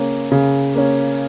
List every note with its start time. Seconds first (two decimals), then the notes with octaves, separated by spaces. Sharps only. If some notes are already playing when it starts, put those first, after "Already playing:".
Already playing: C#3 A#3 C#4
0.32 C#3
0.75 A#3 C#4